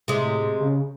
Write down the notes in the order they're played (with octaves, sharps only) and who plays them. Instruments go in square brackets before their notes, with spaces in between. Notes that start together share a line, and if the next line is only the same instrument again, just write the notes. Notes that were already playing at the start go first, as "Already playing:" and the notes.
[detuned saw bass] A2 [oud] C3 G#3
[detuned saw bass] C#3